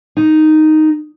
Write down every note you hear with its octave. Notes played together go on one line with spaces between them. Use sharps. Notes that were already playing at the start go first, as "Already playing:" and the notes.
D#4